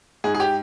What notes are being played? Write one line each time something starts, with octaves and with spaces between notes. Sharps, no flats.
G#2 G#4
G#4
G4